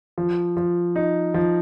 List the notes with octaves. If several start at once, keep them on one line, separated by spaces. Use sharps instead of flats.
F3
F3
D#4
F3